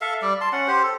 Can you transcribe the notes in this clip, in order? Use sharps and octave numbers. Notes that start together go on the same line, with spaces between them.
A4 E5 F5
G3 D5
A5 C6
C#4 F#5
G4 C5
A4